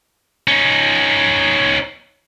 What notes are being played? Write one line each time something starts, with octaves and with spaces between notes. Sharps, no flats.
C#4 D#4